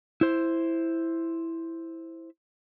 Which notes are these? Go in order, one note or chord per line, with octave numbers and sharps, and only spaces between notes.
E4 C5